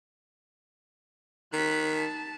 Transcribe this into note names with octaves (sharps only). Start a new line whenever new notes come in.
D#3 F#6 B6
A5